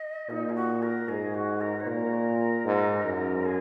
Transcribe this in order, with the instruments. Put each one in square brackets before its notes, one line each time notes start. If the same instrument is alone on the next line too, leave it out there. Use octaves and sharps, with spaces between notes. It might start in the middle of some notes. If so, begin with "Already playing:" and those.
Already playing: [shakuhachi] D#5
[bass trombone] A#2 [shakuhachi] D#4
[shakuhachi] G#4
F#4
A#4
[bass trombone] G#2 [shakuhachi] G#4
[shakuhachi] F#4
A#4
C#5
[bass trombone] A#2 [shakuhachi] A#4
[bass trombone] G#2
F#2
[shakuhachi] G#4